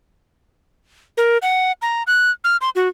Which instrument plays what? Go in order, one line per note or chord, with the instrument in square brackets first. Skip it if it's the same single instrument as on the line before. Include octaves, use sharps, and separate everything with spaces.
[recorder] A#4
F#5
A#5
F#6
F6
C6
F#4